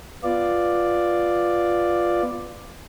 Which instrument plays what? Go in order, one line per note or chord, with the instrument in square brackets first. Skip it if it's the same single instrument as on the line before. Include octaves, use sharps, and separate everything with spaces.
[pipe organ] B3 F4 D5